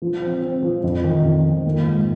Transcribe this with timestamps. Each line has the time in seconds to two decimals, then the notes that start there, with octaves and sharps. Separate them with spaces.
0.02 F3
0.22 C4
0.42 C4
0.63 F3
0.83 F2
1.04 D#3
1.24 F2
1.45 D#3
1.66 A#3
1.85 G#2